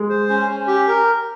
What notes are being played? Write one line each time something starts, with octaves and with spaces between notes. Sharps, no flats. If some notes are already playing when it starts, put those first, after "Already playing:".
Already playing: G#3
C5
C#4
C#4
G4
A#4